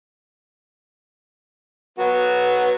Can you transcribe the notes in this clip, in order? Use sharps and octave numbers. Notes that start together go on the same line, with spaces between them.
F#3 B3 F#4